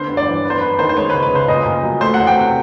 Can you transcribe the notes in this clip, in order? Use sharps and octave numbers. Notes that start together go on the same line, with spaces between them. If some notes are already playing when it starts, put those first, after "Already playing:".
Already playing: D3 B3 C5
G2
D5
E3
B3
C5
F#2 B4
D#3 C5
C5
G#3 C#5
B4
C#2
B4
C#3 C5
A#2 D#5
A#2
F#3
A3 C5
E2 F#5
G5
C3